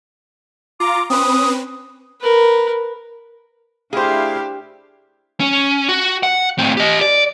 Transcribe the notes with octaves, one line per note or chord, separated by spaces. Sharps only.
F4 A#5 D6
C4 C#4 B4 D#6
A#4 B4
A3 D4 E4 G4 G#4 C5 F5
C#4
F#4
F#5
A2 C4
G4 D#5
D5